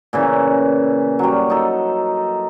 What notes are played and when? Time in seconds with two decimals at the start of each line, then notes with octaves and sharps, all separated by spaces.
0.13 A#2 C#3 E3
1.19 F#3 G3
1.50 D#4 A4